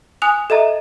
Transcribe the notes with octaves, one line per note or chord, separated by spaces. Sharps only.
G#5 D#6 F#6 F7
A4 D#5 E5 A#5